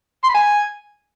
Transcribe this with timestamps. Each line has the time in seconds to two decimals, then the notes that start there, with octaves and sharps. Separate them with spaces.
0.23 C6
0.29 B5
0.34 G#5